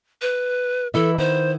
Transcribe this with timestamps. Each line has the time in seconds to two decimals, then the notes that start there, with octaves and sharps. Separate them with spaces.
0.22 B4
0.94 E3 E4 A4 E5
1.18 D#3 B3 E4 C5